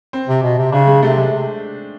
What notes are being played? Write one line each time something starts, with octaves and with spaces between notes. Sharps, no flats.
C4
C3
B2
C3
C#3 D4
G#3
C3 A3
G#3
C3